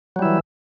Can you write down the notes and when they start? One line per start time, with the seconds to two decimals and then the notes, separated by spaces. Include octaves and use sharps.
0.16 F#3
0.19 G3
0.22 E4
0.25 E3